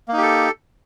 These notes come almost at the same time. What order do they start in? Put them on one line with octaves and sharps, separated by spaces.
A#3 D#4 G4 A4